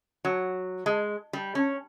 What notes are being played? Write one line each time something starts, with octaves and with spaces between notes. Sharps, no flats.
F#3
G#3
G3
C#4